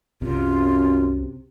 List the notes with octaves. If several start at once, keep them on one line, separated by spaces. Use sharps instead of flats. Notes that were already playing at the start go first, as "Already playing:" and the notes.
C2 F#2 C3 F4